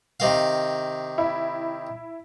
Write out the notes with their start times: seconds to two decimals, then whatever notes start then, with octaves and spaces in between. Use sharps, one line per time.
0.20 C3 D#3 F5
1.18 E4